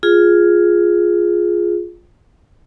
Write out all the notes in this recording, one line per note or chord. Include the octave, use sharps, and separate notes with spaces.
F4 G#4